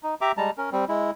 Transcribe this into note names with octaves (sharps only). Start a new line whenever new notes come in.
D#4
G4 E5 A#5 D6
G3 G#3 A5 A#5
C#4 A#4
G3 C4
G#3 E4